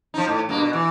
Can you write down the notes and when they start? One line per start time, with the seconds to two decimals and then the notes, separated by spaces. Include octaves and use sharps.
0.14 F3 D#4
0.28 A2
0.49 G2 B2 A#3
0.61 B2
0.73 E3